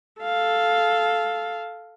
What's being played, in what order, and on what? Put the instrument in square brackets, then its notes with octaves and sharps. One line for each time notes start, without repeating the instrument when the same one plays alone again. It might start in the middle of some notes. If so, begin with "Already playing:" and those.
[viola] A4 F5